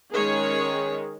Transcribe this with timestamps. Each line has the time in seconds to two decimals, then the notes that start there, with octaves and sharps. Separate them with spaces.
0.13 D#3 G#3 C#4 G#4 C#5